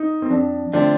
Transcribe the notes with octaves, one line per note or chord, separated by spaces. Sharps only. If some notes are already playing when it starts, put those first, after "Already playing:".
Already playing: D#4
C4
F2 D4
D3 F3 A3 C4 D4